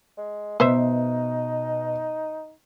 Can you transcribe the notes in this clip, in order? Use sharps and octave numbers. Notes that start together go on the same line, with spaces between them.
G#3
B2 D#4 B4 C5 E5